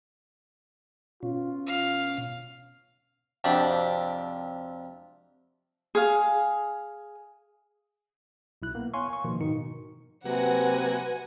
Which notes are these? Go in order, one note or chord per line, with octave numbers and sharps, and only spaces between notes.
B2 C#4 F4
F5
F2 C3 D4 F#4 D5 B5
G#4 F5
B1 E4 F#6
A#3 B3
C#5 F5 G#5 C6 C#6
C#6
B2 D#3 F3 A#3
G#2 B2 D#3 D#4 C#7
C3 F#3 A#3 F#4 B4 F#5 G#5